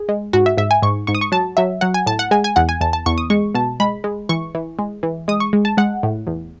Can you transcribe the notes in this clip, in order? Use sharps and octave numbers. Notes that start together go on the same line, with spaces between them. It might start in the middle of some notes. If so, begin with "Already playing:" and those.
Already playing: G#4
G#3
G#2 F#4
E5
G#2 E5
G#5
G#2 C#6
G#2 C#6
D#6
C#6
F#3 A5
F#3 E5
F#3 F#5
G#5
A2 A5
F#5
G#3 G#5
G#5
E2 F#5
G#5
E2 A5
A5
E2 C#6
D#6
G#3 C#6
B2 A5
G#3 B5
G#3
E3 C#6
E3
G#3
E3
G#3 D#6
C#6
G#3
A5
G#3 F#5
A2
E2